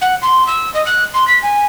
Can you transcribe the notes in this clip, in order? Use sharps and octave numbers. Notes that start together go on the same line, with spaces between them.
F#5
C6
E6
D#5
F#6
C6
B6
G#5